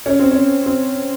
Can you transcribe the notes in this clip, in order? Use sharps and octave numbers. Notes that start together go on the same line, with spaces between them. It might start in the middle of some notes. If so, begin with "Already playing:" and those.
C#4
C4
C#4
C4